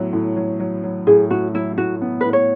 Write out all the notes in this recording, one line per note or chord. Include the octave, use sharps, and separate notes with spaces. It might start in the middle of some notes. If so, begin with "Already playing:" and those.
Already playing: A2 F#3 B3
A2
F#3
F#3
F#3
A2 G#4
A2 F#4
F#3 E4
A2 F#4
B3
A2 B4
C#5